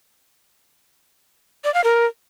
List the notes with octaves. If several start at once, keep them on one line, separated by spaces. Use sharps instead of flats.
D5
F5
A#4